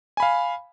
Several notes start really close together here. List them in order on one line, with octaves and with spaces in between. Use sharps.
G#5 B5 F5